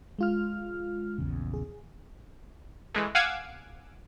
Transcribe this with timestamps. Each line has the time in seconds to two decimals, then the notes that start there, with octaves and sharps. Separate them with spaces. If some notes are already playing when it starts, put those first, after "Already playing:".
0.19 G#3 F4 F6
1.18 A#1 E2 C#3
1.54 G#4
2.94 E3 G#3 A3
3.15 F5 F#5 G#5 D6 E6 G#6